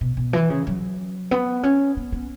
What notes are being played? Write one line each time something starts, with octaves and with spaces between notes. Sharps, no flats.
B2
B2
E3
C#3
F#3
B3
C#4
B3
B3